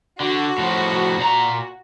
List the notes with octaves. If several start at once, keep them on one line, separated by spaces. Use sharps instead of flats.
D3 F#4
A2 F3
A#2 A#5